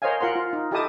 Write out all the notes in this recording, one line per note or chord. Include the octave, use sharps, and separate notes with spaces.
A#4 C5 C#5 D#5 F5 G#5
F4 A#4 F#5 C6
F4
D#4
E4 G4 A4 D#5 A5 D#6